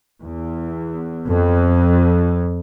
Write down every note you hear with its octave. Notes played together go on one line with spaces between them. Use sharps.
E2
F2